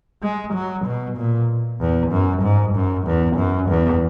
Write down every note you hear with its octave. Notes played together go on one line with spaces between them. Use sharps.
G#3
F#3
B2
A#2
E2
F#2
G#2
F#2
E2
F#2
E2